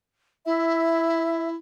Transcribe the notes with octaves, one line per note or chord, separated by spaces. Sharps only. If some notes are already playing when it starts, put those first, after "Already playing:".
E4 E5